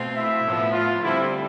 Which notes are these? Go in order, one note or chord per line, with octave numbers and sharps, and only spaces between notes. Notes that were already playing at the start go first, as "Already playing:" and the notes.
Already playing: B2 A3 C4 F4
E4 E5
A2 F3 B3
F4
D3 G3 C4 E4